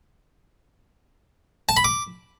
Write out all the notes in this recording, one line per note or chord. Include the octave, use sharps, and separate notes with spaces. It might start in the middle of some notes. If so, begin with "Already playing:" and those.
A5
B5
D6